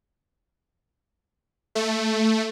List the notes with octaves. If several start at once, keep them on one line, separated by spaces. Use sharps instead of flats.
A3